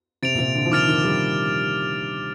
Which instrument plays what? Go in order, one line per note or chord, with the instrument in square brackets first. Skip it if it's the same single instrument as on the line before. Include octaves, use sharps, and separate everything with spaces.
[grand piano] C3 [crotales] A6 D7 F7
[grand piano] A#2
C3
D3
F3
[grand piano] D#3 [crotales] D6 F6 A6 D7 F7
[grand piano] D#3
G3